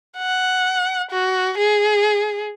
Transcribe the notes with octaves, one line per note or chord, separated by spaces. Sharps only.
F#5
F#4
G#4